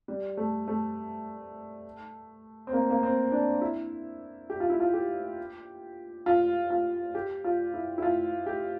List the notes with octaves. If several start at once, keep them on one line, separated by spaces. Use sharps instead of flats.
G3
A3
A3
C4
A#3
A#3
C4
D4
E4
G4
F4
E4
F4
G4
F4
F4
G4
F4
E4
E4
F4
G4